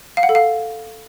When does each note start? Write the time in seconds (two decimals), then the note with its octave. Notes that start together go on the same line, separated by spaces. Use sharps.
0.17 F5
0.23 F#5
0.29 A4
0.35 F5